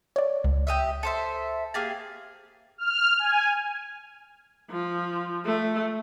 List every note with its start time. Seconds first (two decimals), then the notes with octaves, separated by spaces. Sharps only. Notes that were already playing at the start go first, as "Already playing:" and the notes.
0.16 C#5 D5
0.44 C#2
0.67 G4 D#5 E5
1.03 A4 C5 E5
1.74 A#3 G4 G#4 A6
2.78 F6
3.19 G#5
4.70 F3
5.45 A3